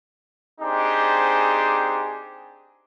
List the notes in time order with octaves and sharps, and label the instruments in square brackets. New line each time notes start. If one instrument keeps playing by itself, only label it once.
[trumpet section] C4 D4 D#4 G4 G#4 C5